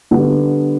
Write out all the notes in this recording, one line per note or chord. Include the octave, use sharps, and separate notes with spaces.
D3 G3 B3 D4